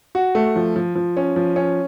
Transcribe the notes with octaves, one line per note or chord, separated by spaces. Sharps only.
F#4
A3
F3
F3
F3
C#4
F3
C#4